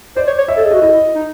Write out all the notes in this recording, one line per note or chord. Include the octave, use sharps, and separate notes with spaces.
C5 D5
C#5
C#5
E5
A4
D#5
G#4
F#4 D#5
E4 D#5
D#4